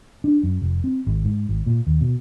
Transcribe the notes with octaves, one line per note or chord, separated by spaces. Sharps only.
D4
F#2
F1
C4
G#1
G#2
G#1
A#2
D#2
B2